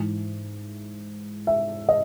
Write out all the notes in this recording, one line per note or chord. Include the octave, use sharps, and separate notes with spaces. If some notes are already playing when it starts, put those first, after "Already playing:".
Already playing: G#2 E3
E5
D#5